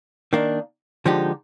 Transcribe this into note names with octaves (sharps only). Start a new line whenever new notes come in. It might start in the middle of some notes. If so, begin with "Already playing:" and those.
D#3 A#3 D4
D3 F3 G#3 D#4 G4